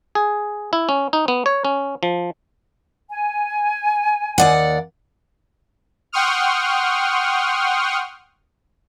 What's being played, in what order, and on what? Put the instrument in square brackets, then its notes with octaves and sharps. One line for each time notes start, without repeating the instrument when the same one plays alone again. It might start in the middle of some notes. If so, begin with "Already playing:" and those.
[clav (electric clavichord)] G#4
E4
C#4
D#4
B3
C#5
C#4
F3
[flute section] G#5
[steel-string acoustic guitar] D#2 D5 F#5
[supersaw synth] F#5 G5 C6 C#6 D#6 F6